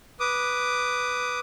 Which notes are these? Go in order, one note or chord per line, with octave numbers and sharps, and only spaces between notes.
B4 D6 D#6